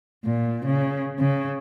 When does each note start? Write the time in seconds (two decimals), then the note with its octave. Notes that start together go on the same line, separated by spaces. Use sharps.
0.24 A#2
0.65 C#3
1.19 C#3